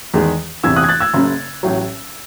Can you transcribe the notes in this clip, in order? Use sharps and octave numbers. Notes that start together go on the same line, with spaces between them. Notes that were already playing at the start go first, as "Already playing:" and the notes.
E2 D#3 G#3
E2 C3 E3 E6 G#6
D#6 F#6
G#6
F#6 A6
E6 G#6
F#1 F#2 C#3
A1 A2 F#3